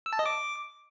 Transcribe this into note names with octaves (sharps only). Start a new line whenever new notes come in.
E6
A5
D#5
D6